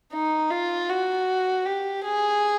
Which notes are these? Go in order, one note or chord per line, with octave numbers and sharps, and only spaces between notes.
D#4
F4
F#4
G4
G#4